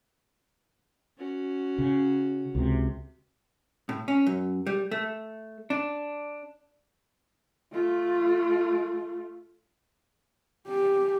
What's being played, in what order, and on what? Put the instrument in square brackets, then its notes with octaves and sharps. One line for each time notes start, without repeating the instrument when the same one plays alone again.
[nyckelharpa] C#4 F#4
[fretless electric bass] C#3
C#2 C3
[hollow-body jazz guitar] A2
C#4
F#2
G3
A3
D4
[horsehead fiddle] A3 F4
G4